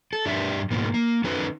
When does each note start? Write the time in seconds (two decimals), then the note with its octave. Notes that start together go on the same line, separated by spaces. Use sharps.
0.13 A4
0.25 G2 D4 G4 D5 E5
0.71 G#2 B2 D#3 A#3
0.94 A#3
1.24 D#3 C#4 D#4 A4 B4